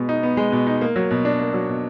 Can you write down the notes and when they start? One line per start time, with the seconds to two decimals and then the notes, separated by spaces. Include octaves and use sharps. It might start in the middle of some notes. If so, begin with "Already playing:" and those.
Already playing: B2 G#3 B3
0.09 D#4
0.23 B3
0.37 G#3
0.52 B2
0.67 D#4
0.81 A#3
0.96 F#3
1.11 B2
1.25 D4
1.40 A#3
1.54 F#3
1.69 B2